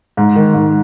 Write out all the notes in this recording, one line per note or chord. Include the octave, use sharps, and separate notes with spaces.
G#2
D#3
G#2